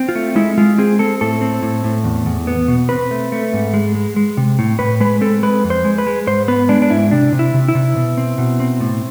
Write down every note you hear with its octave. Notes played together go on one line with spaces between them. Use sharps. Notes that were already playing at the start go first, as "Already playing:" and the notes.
Already playing: C4
F4
A3
G#3 E4
G#3 F4
C4 G#4
C4 A4
A2 A4
C4
A2
A2
E2
E2
B3
B2
C4 B4
A3
A3
G#2
G#3
G#3
G#3
C3
A2
A2 B4
G#3 B4
C4 A4
G#3 B4
F2
C5
G#3
B4
G#3
G#2 C5
B3 B4
G#3 D4
D4
G#2 E4
C3 D4
C3
E4
C3
E4
C3
B2
C4
B2
C4
A2